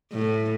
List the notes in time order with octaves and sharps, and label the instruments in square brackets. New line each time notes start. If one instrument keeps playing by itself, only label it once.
[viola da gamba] A2